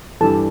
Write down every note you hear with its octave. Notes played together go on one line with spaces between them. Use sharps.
G2 E3 G3 A4 A5